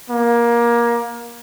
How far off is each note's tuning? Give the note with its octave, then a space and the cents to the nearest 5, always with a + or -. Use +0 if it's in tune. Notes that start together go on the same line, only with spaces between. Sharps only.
A#3 +20